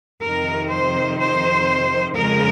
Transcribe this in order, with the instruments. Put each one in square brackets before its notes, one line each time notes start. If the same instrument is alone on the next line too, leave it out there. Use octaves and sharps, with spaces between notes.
[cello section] F2 C3 D#3 A#4
C5
C5
F2 C#3 F3 G#3 A#4